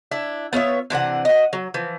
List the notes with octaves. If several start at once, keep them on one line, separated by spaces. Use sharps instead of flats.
D4 E4 E5
B3 F4 C#5 E5
C3 E3 D4 F#5
F#4 D#5
F#3
E3 F3